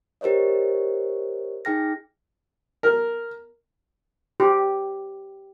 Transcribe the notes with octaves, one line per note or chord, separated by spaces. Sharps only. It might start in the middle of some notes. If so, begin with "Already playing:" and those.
G4 A#4 C5 C#5 D#5
D#4 G#4 G5 F6 A#6
A#4
G4